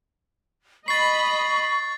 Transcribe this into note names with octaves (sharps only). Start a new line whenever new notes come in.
D#5 B5 C#6 A6 C7